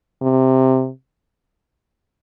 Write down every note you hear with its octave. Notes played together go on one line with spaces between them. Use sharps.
C3